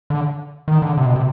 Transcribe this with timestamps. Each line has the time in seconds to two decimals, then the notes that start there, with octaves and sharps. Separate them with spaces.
0.10 D3
0.68 D#3
0.82 D3
0.97 C3
1.06 B2
1.16 C3